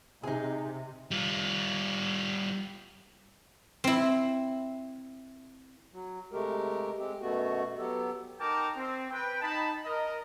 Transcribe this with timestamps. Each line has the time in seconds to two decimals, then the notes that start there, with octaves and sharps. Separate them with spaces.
0.23 C3 D#4 G#4
1.11 G3 F4
3.84 C4 E4
5.93 F#3
6.32 C3 G#3 A3 G4 A#4
6.98 G#3 C4 G4
7.22 F#2 B2 A3 B3 F#4
7.78 F#3 B3 G4 A4
8.40 D#4 F#4 A#4 G5 A5 D6
8.76 C4
9.11 B4 G5
9.41 D#4 A5 B5
9.85 A#4 D#5